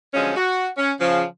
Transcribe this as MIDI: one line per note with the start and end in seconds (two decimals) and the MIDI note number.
0.13 0.34 50
0.13 0.34 53
0.13 0.34 54
0.13 0.34 56
0.13 0.34 61
0.36 0.67 66
0.77 0.92 61
1.00 1.22 49
1.00 1.22 53